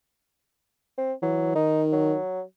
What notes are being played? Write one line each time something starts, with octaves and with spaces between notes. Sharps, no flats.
C4
E3 F#3
D#3 D#4
F#3